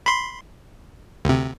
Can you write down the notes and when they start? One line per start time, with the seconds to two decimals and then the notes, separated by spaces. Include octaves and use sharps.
0.06 B5 C6
1.25 D2 C3